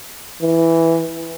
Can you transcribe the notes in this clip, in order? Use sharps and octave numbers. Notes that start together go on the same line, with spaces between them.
E3